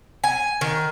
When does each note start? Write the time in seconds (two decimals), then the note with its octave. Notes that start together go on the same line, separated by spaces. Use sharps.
0.24 G#5
0.61 D#3